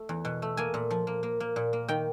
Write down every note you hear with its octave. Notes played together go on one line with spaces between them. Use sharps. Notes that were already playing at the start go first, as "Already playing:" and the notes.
Already playing: A3
E2
B2
A3
A#3 G#5
A#2
F3
A#3
A#3
A#3
A#2
A#3
D#3 G5